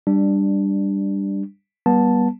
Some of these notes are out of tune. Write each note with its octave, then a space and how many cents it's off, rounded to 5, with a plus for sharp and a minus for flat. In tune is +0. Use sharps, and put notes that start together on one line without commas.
G3 +10 D4 +0
G3 -15 B3 -35 A5 +0